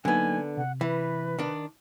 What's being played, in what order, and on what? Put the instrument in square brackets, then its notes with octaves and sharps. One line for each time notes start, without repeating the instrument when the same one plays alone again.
[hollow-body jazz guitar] D3 B3 [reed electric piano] F#3 A#3 D#4 [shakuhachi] G#5
[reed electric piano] C3 [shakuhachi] F#5
[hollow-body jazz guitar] E3 [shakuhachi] B4
[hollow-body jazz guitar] D#3 D4